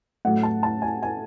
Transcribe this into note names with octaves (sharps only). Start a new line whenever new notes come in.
A2 F#3 A3 F#5
A5
A5
G#5
G#5